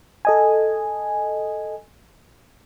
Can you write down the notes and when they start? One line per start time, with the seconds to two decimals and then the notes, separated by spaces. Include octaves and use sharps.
0.25 A4 D#5 G#5